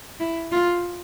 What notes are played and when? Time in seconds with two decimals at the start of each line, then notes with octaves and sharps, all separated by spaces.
0.20 E4
0.52 F4